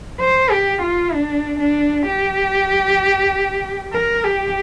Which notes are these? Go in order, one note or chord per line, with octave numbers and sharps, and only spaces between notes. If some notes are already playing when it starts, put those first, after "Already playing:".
C5
G4
F4
D4
D4
G4
A#4
G4